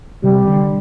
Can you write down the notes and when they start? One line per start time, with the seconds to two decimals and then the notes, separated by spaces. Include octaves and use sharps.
0.24 C3 G3
0.47 D3